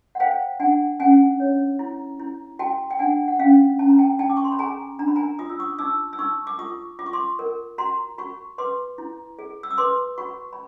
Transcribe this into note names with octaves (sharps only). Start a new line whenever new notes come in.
F#5
C5 F5 G5
D4 F#5 G#5
C#4 F#5 G#5
C#5
E4
E4
F#4 G5 A5
G5
D4 F#5 G#5
F#5
C#4 F5 G5
C#4 A5
A#5
G5 A5
D#4 G5 A5
D6
C#6
C6
B5
G#4 G#5 A#5
D4 A#5
B5
G#5 A#5
F4 D#6
E6
C#6 D#6
D#4 D6 E6
E6
D#4 C#6 D#6
D6
F4 C#6 D#6
F4 D6
C#6
C6 D6
A#4
F#4 A#5 C6
F#4 B5 C#6
B4 C6 D6
E4
G#4
E6
D#6
B4 C6 D6
F#4 B5 C#6
B5